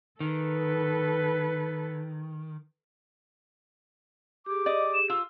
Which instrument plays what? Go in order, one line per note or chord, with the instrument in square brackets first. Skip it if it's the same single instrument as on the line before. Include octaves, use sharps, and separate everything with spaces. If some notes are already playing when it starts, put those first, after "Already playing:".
[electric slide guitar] D#3 [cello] A4 B4
[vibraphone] G4 G#4 [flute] D6
[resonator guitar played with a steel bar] D5 D#5
[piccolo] E7
[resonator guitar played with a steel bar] F4 [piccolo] E6